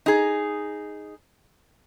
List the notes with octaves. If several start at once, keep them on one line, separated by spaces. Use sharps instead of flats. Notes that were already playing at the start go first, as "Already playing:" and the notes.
D#4 G#4